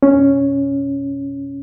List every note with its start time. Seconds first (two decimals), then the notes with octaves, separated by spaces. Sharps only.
0.03 C#4